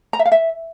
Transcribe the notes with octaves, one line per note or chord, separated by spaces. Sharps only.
A#5
E5
F5
E5